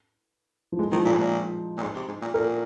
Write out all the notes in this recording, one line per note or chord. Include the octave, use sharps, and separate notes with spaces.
F3
G#3
D#3 F3
A#2 D#4
G#2
A#2
A#2
G#2
C3
G#2
A#2
A#2 A#4